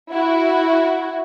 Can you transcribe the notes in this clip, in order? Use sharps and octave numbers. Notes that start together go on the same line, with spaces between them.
E4 F#4